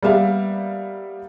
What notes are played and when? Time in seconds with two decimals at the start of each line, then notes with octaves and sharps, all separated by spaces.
0.02 G3 A#3 B3 G4 E5 F5